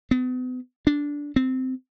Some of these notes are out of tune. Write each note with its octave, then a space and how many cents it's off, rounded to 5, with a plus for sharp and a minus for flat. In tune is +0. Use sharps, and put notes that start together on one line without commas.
B3 +40
D4 -10
C4 -15